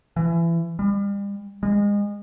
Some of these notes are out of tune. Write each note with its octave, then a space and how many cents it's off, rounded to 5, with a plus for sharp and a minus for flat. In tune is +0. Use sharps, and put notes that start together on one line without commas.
E3 +25
G3 +40
G#3 -30